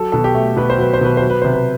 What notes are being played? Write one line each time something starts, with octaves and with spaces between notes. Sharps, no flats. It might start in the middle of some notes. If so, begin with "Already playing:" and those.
Already playing: F#3 A4
B2 A4
G4
A3
B2 B4
C5
F#3 B4
C5
B2 B4
F#3 C5
B4
C3 C5
B4